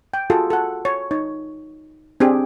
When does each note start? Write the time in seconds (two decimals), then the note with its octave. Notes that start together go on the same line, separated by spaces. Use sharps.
0.14 G5
0.30 F4 F#4 G#4 A4
0.50 A4 F#5
0.85 C#5
1.11 D#4 C#5
2.20 C4 D4 G4 G#4